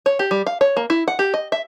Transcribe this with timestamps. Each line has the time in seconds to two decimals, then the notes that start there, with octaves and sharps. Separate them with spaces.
0.06 C#5
0.19 G4
0.31 G3
0.47 F5
0.61 C#5
0.77 A#3
0.90 E4
1.08 F#5
1.19 G4
1.34 D#5
1.52 E5